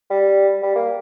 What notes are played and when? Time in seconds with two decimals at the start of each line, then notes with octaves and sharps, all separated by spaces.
0.10 G3
0.62 G3
0.75 A#3